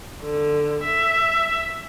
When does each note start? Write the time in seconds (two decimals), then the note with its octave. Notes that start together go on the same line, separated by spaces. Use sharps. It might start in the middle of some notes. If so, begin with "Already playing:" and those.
0.22 D3
0.83 E5